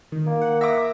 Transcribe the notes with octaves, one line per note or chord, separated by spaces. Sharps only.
D#3
A#3
F#5
E5 D6 A#6